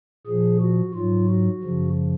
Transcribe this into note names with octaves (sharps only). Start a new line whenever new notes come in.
A#2 F3 G#4
F#4
G#2 F#3 F4
F#4
F#2 C#3 F3